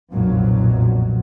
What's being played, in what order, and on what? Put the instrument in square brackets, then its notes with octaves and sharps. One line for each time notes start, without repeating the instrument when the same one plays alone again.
[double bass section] F1 B1 F#2 A#2 F3 F#3